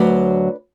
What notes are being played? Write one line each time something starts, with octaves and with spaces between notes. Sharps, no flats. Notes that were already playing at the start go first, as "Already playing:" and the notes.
Already playing: D2 F#3 B4 D5